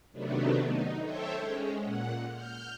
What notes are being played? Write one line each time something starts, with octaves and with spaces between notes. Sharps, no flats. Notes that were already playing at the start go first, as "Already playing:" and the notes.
C3 D#3 F#3 A3 B3 D4
D#4
A4 C5 C#5 E5 G5
G#3 C#4
A#2 F#5
F6 G6